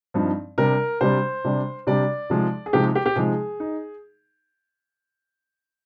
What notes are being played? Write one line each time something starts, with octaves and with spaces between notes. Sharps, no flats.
G2 F3 C4 D#4
C3 G3 D4 A#4
C3 G3 D4 C5
C3 G3 D4
C3 G3 D4 D5
C3 F3 G#3 D#4
G#4
C3 F3 G#3 D#4 G4
G4
G4
C3 F3 G#3 D#4 G#4
D#4